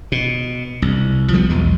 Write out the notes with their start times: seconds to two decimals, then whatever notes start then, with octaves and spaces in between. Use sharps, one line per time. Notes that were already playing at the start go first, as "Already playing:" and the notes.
0.12 B2
0.82 C2
1.33 F3 G3 A3 B3
1.49 B1 E2 G#3